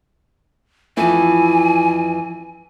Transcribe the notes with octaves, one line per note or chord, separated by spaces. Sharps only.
F2 E3 E4 G#5